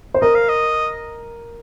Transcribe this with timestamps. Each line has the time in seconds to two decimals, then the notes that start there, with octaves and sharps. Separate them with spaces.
0.14 C5
0.22 A#4 D#5
0.35 F5
0.49 D#5